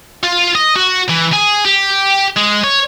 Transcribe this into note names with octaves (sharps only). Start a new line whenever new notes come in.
F4
D#5
F#4
E3
G#4
G4
G#3
C#5